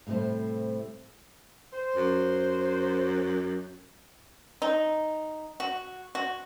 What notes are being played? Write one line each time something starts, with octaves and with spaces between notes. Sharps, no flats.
A2 C3 G3 A3 C5
C5
F#2
D#4
F#4
F#4